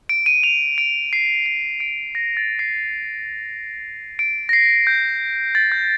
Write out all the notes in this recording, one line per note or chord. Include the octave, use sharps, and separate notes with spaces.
D7
D#7
F7
D7
C7
C7
D7
A#6
A6
C7
D7
A#6
C7
G6
A6
G6